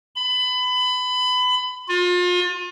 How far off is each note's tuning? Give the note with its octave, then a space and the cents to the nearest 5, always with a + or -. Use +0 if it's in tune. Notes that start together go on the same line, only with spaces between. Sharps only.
B5 +25
F4 +35